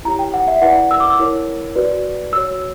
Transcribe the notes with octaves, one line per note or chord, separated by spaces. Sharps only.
E4 G4 C#5 A#5
G5
F#5
E5
E4 B4 D5 F#5
E6
D6
E6
E4 A#4 C#5
F#4 B4 D5
F#4 C#5 E6